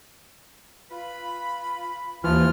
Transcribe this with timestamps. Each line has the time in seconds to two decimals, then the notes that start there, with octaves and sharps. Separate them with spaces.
0.90 F4 B4 B5
2.24 D#2 E3 F3 F4 F6